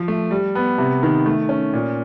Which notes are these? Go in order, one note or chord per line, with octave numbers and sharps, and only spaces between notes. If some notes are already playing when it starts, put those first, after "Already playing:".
Already playing: F3
A3
G3
B3
C3
D#3
A3
C#4
A#2